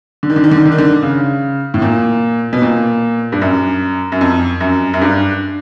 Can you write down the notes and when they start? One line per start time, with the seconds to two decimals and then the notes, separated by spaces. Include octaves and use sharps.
0.23 D3
0.30 D#3
0.36 D3
0.44 D#3
0.51 D3
0.58 D#3
0.66 D3
0.72 D#3
0.78 D3
1.03 C#3
1.74 A2
1.82 A#2
2.53 B2
2.62 A#2
3.32 G2
3.42 F#2
4.12 F#2
4.21 F2
4.61 F#2
4.94 F#2
5.02 G2